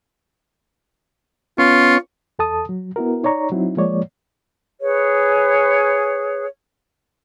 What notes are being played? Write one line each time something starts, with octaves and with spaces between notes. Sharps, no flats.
B3 C#4 F4 C#6
E2 A4 A5 D#6
F#3
B3 E4 F#4 A#4
D#4 C#5 D5 A#5 C#6
F#3 C4 D#4 E4
F3 G#3 A#3 C#5 D5
G#4 B4 C#5